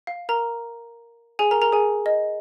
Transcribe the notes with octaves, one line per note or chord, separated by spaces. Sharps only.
F5
A#4 A#5
G#4 G#5
A#4 A#5
A#4 A#5
G#4 G#5
D#5